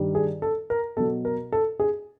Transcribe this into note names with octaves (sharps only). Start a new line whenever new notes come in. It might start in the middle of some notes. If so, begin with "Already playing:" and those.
Already playing: G2 D#3 G3
G#4
A4
A#4
B2 F#3 A4
A#4
A4
G#4